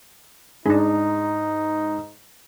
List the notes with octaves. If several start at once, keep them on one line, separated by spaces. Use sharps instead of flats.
G#2 D4 D#4 G#4